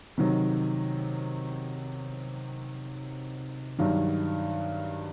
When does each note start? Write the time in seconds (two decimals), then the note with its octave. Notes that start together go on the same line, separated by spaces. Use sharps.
0.18 C3 D#3 F#3
3.79 G2 D#3 F#3